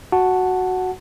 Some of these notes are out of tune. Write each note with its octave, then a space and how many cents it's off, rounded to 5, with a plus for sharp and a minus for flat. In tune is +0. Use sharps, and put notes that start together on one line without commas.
F#4 +0 F#5 +0 A5 +0